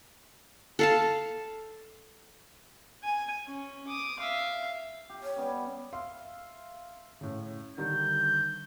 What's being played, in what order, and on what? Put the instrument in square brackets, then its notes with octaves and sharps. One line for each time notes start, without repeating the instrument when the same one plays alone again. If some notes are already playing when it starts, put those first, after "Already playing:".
[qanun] A4 F5 A5
[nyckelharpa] G#5
C#4
D6 D#6
E5 F5
[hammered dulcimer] G4
[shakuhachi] C#5
[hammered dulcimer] G3 B3 C#4
[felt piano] E5 F5 C6
A2 C#3
[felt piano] D3 D#3 G3 [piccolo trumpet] G6